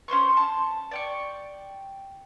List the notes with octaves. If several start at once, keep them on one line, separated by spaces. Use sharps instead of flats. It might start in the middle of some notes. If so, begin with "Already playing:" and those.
C#4 C5 C6 C#6
A5
D5 G5 C#6